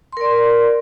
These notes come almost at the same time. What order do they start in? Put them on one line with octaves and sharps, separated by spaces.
C6 A#4 D5